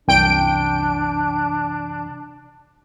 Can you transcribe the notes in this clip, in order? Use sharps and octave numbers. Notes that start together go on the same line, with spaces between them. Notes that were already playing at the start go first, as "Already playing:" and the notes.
C2 F#2 C3 E3 D4 G5 D7